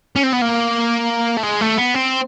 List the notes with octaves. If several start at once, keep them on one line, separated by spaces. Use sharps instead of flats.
C#4
C4
B3
A#3
A3
G#3
A3
B3
C4